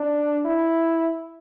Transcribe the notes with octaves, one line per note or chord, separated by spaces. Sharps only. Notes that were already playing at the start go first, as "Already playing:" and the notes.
Already playing: D4
E4